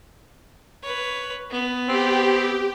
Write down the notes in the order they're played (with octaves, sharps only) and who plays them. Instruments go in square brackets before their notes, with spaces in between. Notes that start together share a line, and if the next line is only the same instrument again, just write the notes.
[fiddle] B4 C#5
B3
[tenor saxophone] C4 [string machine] G4